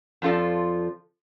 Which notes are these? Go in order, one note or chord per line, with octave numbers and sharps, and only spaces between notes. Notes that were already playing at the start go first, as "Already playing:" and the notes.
F2 F3 F4 A4 D5